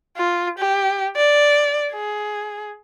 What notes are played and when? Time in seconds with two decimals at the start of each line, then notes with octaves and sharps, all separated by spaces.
0.17 F4
0.58 G4
1.16 D5
1.92 G#4